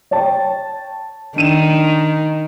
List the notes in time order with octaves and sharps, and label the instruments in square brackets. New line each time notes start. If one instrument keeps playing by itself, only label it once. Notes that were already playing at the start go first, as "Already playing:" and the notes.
[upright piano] C#5 G5 A5
[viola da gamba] D#3 [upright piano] D4 D#7 E7